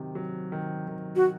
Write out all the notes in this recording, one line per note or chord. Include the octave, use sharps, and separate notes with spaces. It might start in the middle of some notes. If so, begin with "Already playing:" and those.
Already playing: C3 D#3 F#3
F#3
D#3
D#3
F#4